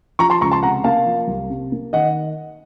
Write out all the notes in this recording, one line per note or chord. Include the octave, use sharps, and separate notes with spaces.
F3 A#5 C#6
A5 C6
C#2 A#5 C#6
A5 C6
C3 F#5 A#5
A#3 F5 A5
F3
C2
C3
A#3
D#3 D#5 F#5